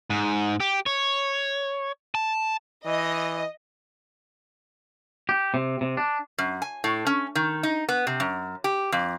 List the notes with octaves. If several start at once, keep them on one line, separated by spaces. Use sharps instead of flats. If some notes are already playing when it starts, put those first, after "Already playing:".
G#2
G4
C#5
A5
E3 D#5
G4
C3
C3
D4
F#2
G#5
A2
C#4
D#3
D#4
B3
C3
F#2
G4
F2